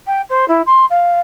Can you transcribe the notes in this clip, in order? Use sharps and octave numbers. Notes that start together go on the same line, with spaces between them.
G5
C5
E4
C6
F5